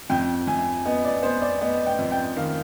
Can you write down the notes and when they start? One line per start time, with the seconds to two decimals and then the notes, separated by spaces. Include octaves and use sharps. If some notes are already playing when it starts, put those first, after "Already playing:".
0.10 F2 G5
0.47 F2 G#5
0.85 B3 D#5
1.05 D5
1.23 B3 C5
1.42 D5
1.61 B3 D#5
1.86 G5
1.99 F2
2.12 G5
2.36 D#3 F5